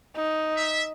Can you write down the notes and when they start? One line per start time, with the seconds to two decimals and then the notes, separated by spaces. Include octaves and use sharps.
0.16 D#4
0.56 E5